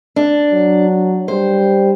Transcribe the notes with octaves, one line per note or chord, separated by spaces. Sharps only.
D4
F#3
G3 C5